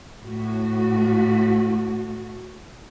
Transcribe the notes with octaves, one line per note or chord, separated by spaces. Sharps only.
A2 F#4